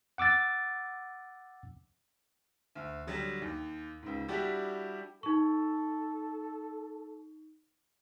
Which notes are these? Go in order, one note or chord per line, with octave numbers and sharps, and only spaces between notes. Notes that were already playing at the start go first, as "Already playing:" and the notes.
F#5 D6 E6 A6
D2
D3 F#3 G3
D#2
C#2 G#2
G3 D4 E4 F#4 G4
D#4 A4 C#6